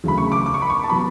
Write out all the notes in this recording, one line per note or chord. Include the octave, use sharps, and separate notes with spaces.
D2 C#3 F#3 B5
C#6
D6
D6
C#6
B5
C#6
A5
B2 F#3 B5